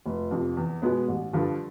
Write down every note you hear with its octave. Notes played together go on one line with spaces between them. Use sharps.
F1
F2 C3
E2
B2 G#3 B3
A1
G2 D3 F3